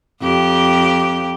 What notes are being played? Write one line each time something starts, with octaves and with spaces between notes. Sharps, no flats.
F2 G4